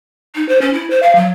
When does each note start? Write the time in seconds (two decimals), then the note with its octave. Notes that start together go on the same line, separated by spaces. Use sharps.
0.35 D#4
0.49 C5
0.61 C#4
0.74 E4
0.90 C5
1.03 F5
1.15 F#3